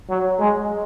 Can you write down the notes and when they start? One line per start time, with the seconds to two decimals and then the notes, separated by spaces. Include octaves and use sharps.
0.10 F#3
0.40 G#3